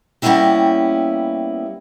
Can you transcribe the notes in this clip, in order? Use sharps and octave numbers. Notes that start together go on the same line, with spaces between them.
G3 A#3 B3 C#4 E4 G4